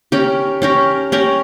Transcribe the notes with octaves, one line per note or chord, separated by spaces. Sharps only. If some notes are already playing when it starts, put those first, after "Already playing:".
C#4 G4 A#4
C#4 G4 A#4
C#4 G4 A#4